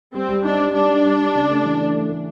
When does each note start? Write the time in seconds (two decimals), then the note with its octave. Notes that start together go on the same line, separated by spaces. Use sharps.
0.13 G3 C4
0.29 G3
0.44 D4 D#4
0.59 G3
0.74 G3 D4
0.89 G3
1.05 G3
1.20 G3
1.35 C#3
1.49 A3
1.65 E3
1.80 A3
1.95 A3
2.09 A3